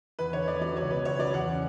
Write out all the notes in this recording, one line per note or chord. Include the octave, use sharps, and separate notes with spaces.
E2 B4
D3 C#5
E2 D5
F#3 D5
C#2 C#5
B2 B4
C#2 C#5
F#3 D5
E2 F#5
C#3